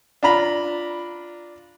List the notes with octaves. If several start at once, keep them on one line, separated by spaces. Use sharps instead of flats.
D4 F4 A#5 B5